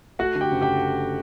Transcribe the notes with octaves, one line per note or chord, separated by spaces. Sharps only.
A3 F#4 F#5
D3
G4 G5
F#1
G4 G5